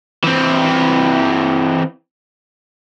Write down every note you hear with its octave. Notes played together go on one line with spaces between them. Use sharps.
E3 C4